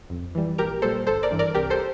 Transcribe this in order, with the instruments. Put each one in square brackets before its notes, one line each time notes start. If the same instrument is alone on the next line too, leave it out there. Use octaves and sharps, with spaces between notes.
[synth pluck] F2
E3 G3
A#1 G4 A#4
A#2 G3 A4 C5
G1 A4 C5
A#4 D5
G2 E3
A#4 D5
C2 G4 A#4
A4 C5